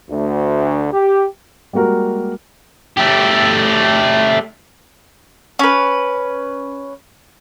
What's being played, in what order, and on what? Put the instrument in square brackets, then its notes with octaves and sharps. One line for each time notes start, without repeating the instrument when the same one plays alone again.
[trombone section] D2
G4
[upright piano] G3 G#3 A#3 F#4 A#4
[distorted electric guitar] A3 G4
[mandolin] C#4 B4